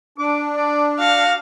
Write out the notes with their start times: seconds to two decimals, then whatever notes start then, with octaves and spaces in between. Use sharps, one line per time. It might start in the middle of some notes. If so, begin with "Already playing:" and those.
0.18 D4 D6
0.56 D5
1.00 F#4 F5